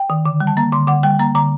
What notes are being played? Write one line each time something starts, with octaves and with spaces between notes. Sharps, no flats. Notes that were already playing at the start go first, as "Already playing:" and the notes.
Already playing: G5
D#3
D3
G3
A5
A#3 A#5
D3 C6
D3 F#5
G3 G5
A#3 A#5
D3 A#5